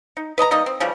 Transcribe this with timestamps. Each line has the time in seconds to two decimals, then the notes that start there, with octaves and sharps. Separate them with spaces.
0.17 D#4
0.38 B4 D#5 A5 A#5
0.51 G3 A#3 D#4 D#5
0.66 C4
0.80 C#3 E3 F3 G3